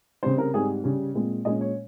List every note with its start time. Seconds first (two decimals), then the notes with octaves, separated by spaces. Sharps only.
0.23 C#3 G3 C4 C5
0.38 A#4
0.54 G#2 G3 C4 G#4
0.84 C#3 G3 C#4
1.14 A#2 G#3 C4
1.45 A#2 G#3 C#4 D#5
1.61 C#5